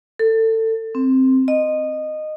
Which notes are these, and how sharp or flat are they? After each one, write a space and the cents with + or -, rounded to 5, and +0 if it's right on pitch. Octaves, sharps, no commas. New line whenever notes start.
A4 +25
C4 +0
D#5 -15